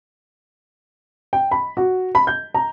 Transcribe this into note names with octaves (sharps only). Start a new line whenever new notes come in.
G5
B5
F#4
B5
G6
A#5